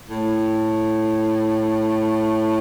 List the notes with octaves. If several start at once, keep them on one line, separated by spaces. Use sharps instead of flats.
A2